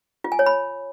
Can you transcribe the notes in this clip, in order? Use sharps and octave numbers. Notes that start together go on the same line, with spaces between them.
F4
G#5
C#5
B5